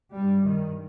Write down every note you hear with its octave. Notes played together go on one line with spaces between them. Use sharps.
G2 G3
D#3